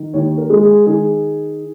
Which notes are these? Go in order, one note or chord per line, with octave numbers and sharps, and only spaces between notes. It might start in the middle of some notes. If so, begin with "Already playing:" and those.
Already playing: D#3
D#2 C#5
A#4
G#3
G#4
D#3 G#4